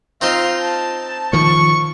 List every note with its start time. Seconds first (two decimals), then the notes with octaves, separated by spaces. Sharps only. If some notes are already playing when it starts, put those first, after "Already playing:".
0.21 C4 D#4 F4 C5
0.60 A5
1.33 D#3 F3 C#6